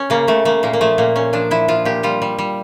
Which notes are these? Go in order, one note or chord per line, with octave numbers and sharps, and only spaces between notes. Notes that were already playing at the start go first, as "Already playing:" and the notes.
Already playing: C#4
C#3 A#3
C#3 A3
A3 A#3
A#2 A#3
A#3
F3 A3
A#2 A#3
A#2 C#4
F3 D4
F3 E4
F3 F4
A#2 G4
G3 F4
G3
G3